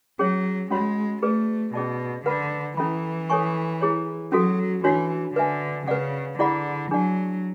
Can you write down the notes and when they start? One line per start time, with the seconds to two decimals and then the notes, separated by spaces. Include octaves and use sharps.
0.19 F#3 C#4 G#4 C#5
0.70 G#3 C#4 F#4 C#5 F#5 B5
1.22 A3 G#4 B4 D5
1.74 B2 C#4 G#4 D5 A5
2.26 D3 B4 F#5 B5
2.77 E3 C#4 E4 A4 E5 B5
3.30 A4 C#5 G#5 C#6
3.81 E4 G#4 C#5
4.32 F#3 C#4 F#4 A4
4.84 E3 D4 F#4 C#5
5.35 D3 B4 E5 G#5
5.87 C#3 B4 D5 F#5
6.39 D3 E4 G#4 D5 F#5 B5
6.91 F#3 D4 G#4 D5 F#5 A5